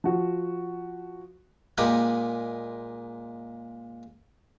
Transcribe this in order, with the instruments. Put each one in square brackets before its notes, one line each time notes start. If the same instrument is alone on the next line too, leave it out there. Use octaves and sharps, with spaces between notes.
[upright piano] F3 F#4
[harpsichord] A#2 G#3 A#3 G4 B4 B5